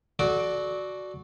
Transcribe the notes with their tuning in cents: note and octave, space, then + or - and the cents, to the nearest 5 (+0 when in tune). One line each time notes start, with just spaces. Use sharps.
F#4 +0 A4 -30 D5 +0